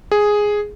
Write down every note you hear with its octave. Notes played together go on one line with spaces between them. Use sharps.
G#4